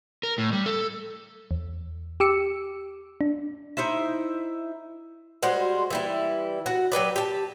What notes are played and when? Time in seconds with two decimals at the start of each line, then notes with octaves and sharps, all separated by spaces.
0.23 A#4
0.38 A2
0.53 G3
0.66 A4
1.51 E2
2.20 G4 D6 E6 C#7
3.21 D4
3.77 D#4 E4 C5 E5
5.43 G3 G#3 F#4 C5
5.90 E3 G3 E4
6.66 F#4 F#5
6.92 F#3 G4 B4 D5
7.16 G4 A5